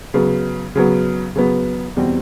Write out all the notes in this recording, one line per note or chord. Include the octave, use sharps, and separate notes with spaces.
C#3 F#3 B3
C#3 F#3 B3
C#3 F#3 B3
E2 B2 G3 C4